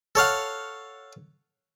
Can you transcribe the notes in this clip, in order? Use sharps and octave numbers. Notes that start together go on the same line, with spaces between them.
A4 C#5 F5 F#5